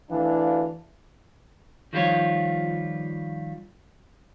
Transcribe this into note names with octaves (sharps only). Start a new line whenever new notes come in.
D2 E3 D4 F5
D#3 F3 G3 F4 C#5